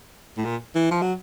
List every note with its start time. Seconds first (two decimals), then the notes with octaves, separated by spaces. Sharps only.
0.38 A2
0.45 A#2
0.75 E3
0.91 F3
1.02 F#3